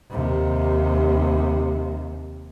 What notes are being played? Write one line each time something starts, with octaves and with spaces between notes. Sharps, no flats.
D#2 C3